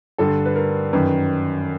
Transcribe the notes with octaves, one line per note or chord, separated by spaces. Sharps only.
G2 D3 A4
B4
A#4
F#2 D#3 B4